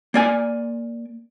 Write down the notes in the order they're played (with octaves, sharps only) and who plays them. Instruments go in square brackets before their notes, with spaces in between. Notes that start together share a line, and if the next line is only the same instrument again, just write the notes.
[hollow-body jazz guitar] A#3 D5 G#5